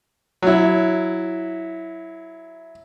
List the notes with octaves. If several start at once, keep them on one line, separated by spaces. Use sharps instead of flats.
F#3 E4